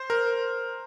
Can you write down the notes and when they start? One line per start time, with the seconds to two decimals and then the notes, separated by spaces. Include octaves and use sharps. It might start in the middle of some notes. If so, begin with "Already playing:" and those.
Already playing: C5
0.10 A#4